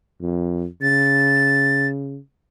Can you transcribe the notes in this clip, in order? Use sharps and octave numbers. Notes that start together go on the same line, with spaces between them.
F2
C#3 A6